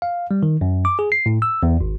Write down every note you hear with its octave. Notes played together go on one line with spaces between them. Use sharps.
F5
G3
D#3
F#2
D6
G#4
C7
A2
E6
E2
G#1